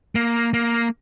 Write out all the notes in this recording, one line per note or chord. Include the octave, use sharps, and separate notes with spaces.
A#3
A#3